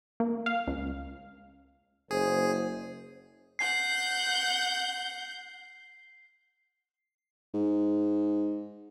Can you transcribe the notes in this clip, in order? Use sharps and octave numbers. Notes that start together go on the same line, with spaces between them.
A#3
F5
C#2
F#1 G#4 C5
F#5 G6 C7
G#2